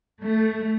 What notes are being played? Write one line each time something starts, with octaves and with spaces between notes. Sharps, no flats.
A3